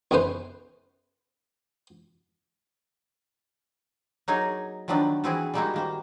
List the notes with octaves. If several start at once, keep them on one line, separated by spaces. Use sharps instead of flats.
B1 F#2 C#3 C#4 B4 C5
F#3 A#3 D#4 G#4 A#4 C#5
D#3 F3 F#3 B3 D4 F#4
E3 B3 C4 E4 F#4 G#4
G3 G#3 A#3 D#4 E4 F#4
D#3 A#3 C5